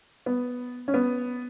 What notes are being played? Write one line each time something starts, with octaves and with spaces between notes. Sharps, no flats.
B3
C#4
B3